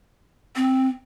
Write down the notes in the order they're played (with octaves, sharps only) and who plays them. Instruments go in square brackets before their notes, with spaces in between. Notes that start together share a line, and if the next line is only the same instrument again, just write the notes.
[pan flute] C4